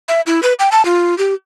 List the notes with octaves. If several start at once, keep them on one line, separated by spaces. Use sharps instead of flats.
E5
E4
B4
G5
A5
F4
G4